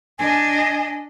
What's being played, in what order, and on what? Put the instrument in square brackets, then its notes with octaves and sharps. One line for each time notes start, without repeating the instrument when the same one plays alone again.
[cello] D4 D#5 [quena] G#5